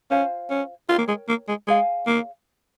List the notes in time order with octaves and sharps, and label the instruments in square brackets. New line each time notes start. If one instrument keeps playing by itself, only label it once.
[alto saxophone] C#4 [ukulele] F4 C5 F5 G#5
[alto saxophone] C#4
[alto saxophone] F4 [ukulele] A#4 C#5 G5
[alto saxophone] A#3
G#3
A#3
G#3
[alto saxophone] G#3 [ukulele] G#4 C#5 F5 G#5
[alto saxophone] A#3